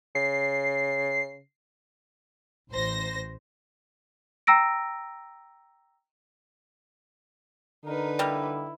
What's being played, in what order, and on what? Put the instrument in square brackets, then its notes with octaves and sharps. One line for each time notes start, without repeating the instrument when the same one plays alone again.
[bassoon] C#3 [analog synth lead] C7
[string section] A1 C5 A#6
[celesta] G5 A#5 E6 A#6 D7
[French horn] D3 [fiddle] D#4 B4 [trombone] A#4
[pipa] G3 A#3 [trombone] E4